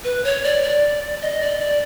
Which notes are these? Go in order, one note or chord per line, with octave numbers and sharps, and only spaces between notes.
B4
C#5
D5
D5
D#5
D5
D5